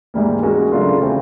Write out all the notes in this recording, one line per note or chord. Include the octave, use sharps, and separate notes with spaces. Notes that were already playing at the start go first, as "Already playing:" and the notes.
G#2 E3 G3 A#3
G#3 C#4 F#4 A#4
C#3 F#3 A3 D4 F4
C#3 E3 G3 C4